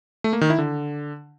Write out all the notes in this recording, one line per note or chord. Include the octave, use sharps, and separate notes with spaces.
A3
A#3
D#3
E4
D3